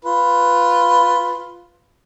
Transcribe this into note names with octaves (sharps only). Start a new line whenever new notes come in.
F4 B4